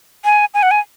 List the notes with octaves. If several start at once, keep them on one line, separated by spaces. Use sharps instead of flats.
G#5
G#5
F#5
G#5